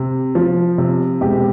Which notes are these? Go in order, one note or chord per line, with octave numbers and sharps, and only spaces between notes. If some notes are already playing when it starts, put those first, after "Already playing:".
Already playing: C3
F3
C3
E1 G4